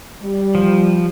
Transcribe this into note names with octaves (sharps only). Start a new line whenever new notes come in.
G3
F3